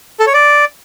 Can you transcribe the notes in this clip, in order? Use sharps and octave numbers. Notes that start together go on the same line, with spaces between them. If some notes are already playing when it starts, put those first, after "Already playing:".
A4
C#5
D5